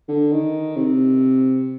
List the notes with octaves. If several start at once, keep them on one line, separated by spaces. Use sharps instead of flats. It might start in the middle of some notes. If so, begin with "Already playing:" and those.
D3
D#3
C3